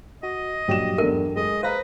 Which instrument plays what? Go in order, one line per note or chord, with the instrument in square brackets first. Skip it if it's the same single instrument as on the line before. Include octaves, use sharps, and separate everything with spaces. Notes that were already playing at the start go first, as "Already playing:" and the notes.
[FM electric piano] F#4 [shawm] D#5
[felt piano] A#1 E7 [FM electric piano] G2 F#3 G4
[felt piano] E2 A3 D4 [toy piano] A#4
[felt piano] G#3 [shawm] D#5
[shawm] B4 [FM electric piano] C5 A#6 [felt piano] F5 A#5